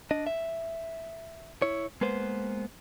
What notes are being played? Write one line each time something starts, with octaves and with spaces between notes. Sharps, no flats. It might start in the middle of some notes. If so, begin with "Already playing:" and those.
D4 D#5
E5
E4 C#5
G#3 A#3 B3 B4 C5